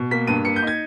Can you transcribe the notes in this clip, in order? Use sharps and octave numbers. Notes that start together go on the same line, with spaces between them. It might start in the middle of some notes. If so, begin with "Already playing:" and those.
Already playing: B2
A#3 B6
G2 D#7
A#3 C#7
G6
D#4
G#6